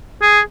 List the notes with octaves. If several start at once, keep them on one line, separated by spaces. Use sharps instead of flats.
G#4